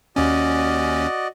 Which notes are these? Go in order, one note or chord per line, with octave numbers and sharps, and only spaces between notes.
D#2 C#4 F#4 D5 D#5